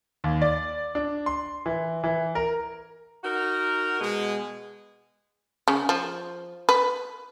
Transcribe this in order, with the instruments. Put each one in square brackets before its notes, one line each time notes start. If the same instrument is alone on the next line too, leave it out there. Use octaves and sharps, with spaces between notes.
[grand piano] D#2
D5
D4
C6
E3
E3
A#4
[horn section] D#4 F#4 A#4
B2 G#3
[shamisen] C#3
F3
B4